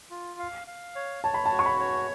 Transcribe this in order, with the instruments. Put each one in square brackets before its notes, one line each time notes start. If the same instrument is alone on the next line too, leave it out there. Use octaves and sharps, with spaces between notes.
[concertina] F4
F5
F5
C#5
[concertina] C#5 [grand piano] A5
[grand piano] B5
A5
[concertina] F#4
[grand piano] C#6
B5
[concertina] C#5